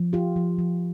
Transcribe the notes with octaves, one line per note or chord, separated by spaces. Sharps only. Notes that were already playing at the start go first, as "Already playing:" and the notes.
Already playing: F3
F4 G4
F3
F3